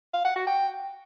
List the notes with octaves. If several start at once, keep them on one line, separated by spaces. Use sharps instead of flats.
F5
F#5
F#4
G5